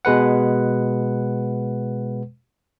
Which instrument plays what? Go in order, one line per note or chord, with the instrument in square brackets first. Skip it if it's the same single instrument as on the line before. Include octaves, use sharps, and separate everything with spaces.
[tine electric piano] B2 G#3 B4 F#5